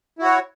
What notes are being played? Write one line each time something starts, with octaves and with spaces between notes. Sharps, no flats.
E4 F#4 C#5